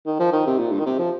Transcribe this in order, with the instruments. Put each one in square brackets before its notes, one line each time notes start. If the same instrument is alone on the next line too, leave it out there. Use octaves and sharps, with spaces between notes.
[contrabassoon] D#3
F3
D#3
C3
A#2
G2
D#3
C3
F3